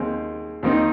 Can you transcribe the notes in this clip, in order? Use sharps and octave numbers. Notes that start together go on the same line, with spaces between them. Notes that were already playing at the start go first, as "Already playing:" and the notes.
Already playing: D#2 G#3 C4
D#2 D#3 C4 D#4